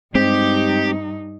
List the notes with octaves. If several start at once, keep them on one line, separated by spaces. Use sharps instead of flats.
G2 G#3 C4 D#4 G4